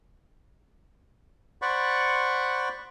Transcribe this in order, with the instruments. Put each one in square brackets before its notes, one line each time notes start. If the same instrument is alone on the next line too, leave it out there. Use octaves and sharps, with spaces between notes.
[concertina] C5 D5 F#5 B5 C#6